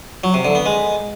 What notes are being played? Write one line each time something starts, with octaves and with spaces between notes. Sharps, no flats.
F#3
C3
D3
B3
G#3